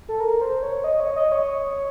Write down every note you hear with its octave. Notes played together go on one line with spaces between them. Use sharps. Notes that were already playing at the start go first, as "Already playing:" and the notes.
A4
A#4
C5
C#5
D#5
C#5
D#5
C#5